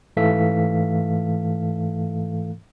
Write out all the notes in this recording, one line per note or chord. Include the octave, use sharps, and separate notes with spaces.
G#2 E3 A3 A4 F5 B6